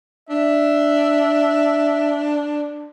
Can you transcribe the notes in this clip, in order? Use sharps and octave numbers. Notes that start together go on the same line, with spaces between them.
D4 E5